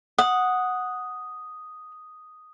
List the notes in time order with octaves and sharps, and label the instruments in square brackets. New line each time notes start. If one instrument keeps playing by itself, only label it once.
[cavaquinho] F#5 [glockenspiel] D#6